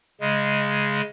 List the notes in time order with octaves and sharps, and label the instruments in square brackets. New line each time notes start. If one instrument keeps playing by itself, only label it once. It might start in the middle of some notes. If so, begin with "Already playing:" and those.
[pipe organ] C#3 G#3